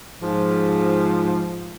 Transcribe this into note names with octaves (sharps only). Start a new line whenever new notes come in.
G#2 F3